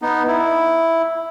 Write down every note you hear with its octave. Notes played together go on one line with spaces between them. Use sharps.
B3 D#4
E4